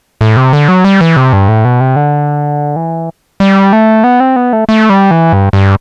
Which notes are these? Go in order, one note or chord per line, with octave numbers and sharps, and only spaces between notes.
A2
C3
D3
F#3
G3
E3
C3
G2
A2
B2
C3
D3
E3
G3
A3
B3
C4
B3
A3
A3
G3
E3
G2
G2